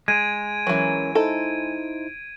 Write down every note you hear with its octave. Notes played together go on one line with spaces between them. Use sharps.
G#3 G#6 D7 D#7
E3 F#3 C#4 A#4 C#5
D#4 E4 A4 C5